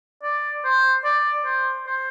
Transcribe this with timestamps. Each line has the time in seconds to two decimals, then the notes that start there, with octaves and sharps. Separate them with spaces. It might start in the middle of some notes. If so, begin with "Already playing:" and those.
0.23 D5
0.64 C5
1.04 D5
1.45 C5
1.86 C5